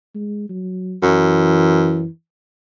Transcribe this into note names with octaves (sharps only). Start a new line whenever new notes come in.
G#3
F#3
F#2 E3